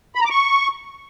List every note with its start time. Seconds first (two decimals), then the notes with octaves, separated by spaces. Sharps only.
0.15 B5
0.20 A#5
0.26 D6
0.31 C#6